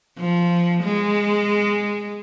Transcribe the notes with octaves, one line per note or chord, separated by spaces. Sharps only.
F3
G#3